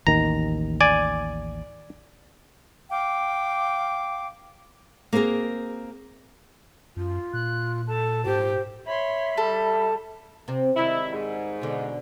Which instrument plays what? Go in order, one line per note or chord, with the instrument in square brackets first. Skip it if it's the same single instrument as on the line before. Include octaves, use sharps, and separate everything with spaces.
[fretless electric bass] A1 D#2 D#3 [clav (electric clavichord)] A#5
[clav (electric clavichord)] D5 G#5
[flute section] F5 G5 D6
[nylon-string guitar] A#3 C4 F#4 G#4 A#4
[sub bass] F#2 [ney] F4
[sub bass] A#2 [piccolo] F#6
[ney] A4 [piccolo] A5
[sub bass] G#2 [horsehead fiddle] G4 [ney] C5
[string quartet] C#5 B5 C6 [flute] E5
[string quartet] G3 [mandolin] A4
[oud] C3 C4
[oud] D#3 G3 G#3 [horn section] E4
[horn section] G#2
[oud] B2 D3